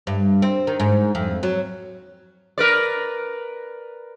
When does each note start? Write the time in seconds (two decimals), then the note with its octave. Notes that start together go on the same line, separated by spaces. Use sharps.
0.07 G2
0.42 C4
0.67 D#3
0.80 G#2
1.15 F2
1.43 F#3
2.58 A#4 B4 D5